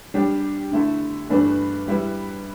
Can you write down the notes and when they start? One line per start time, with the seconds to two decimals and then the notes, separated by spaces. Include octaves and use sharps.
0.14 G3 D4 G4
0.71 D3 A3 E4 A4
1.29 G2 E3 A3 D4 B4
1.88 G3 E4 B4